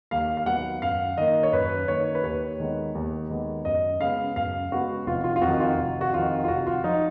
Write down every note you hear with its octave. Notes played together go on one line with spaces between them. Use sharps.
D#2 F5
F5
D#3 F#3 B3 F#5
F#2 F5
D#3 A#3 D#5
C#5
F#2 B4
D#3 A#3 C#5
B4
D#2 C#5
D#3 G#3 B3
D#2
D#3 G#3 B3
F#2 D#5
C#3 G#3 B3 F5
F#2 F5
C#3 G#3 B3 F#4
F1 F4
F4
F4
F2 D#3 F#4
F4
F1
F#4
F2 D#3 F4
F4
F1 F#4
F4
F3 D#4